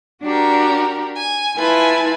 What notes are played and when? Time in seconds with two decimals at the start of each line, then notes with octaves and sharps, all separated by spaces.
0.22 D4 F#4 G4 A#4
1.16 G#5
1.57 E4 F4 B4 G#5 A5